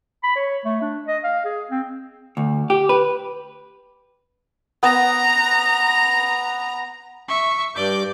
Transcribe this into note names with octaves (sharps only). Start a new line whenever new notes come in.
B5
C#5
A3
D4
D#5
F5
G#4
C4
D2
G4
B4
B3 A#5
E5 C#6
G2 D5 D6 G6